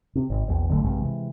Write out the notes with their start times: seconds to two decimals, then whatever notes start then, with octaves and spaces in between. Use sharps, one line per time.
0.15 C3
0.30 G#1
0.48 A#1 E2 B2
0.69 G#1 D3 F#3 A3
0.84 A#1 G2 C3 G#3
1.00 C3 E3 G#3